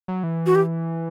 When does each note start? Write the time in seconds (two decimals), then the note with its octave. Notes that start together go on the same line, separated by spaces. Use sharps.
0.08 F#3
0.23 E3
0.46 F#4
0.55 G4